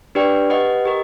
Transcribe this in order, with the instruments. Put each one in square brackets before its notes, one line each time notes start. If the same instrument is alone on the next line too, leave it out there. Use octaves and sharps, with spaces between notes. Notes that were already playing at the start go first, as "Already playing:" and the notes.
[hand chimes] D4 G4 B4 D5 G5
G4 B4 D#5 F#5
G4 A#4 D#5